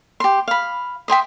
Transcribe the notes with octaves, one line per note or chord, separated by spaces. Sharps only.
G4 C6
F5 B5
E5 G5 C6 D#6